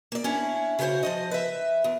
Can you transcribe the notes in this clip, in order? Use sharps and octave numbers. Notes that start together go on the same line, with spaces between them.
A#3 D5
C#4 D4 E4
C#3 F#4 G4 C5 C#5
F3 C5 D#5
B4 E5
E2